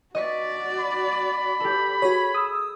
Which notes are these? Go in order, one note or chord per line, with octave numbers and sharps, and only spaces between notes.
F#4 D5 D#5 C#6 B6
B5
G4 A4
F#4 G#4 C#5
D#6 E6